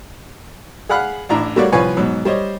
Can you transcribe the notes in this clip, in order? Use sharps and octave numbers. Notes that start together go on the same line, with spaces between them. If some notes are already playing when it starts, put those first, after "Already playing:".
G#4 F5 F#5 B5 F6 F#6
A1 A2 D4 E4 A#5
G3 A3 A#3 F#4 C#5 D5
C2 F3 B4 C#5 G#5 C#6
G#2 B2 F#3
G3 C5 C#5 D#5